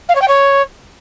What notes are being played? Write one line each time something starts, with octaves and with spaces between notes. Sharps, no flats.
F5
C#5
G5
C#5